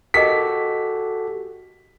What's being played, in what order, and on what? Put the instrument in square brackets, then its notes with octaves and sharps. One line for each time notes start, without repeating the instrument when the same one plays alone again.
[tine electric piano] F#4 G4 A4 [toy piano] A#4 D#5 [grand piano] B6